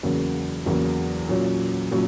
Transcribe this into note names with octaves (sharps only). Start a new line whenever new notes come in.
E2 C#3 F#3 A#3
E2 C#3 F#3 A#3
A#2 F#3 C#4
A#2 F#3 C#4